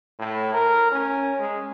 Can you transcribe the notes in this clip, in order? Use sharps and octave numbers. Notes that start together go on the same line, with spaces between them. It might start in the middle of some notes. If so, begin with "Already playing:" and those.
A2
A#4
C#4
G#3